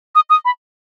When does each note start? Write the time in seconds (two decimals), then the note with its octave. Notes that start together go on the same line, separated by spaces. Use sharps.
0.15 D#6
0.30 D#6
0.45 B5